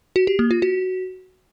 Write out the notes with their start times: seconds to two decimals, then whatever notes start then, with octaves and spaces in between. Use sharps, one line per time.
0.16 F#4
0.27 G4
0.39 A#3
0.51 F4
0.62 F#4